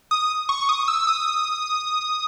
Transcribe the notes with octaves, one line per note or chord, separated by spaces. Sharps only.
D#6
C#6
D#6
E6
D#6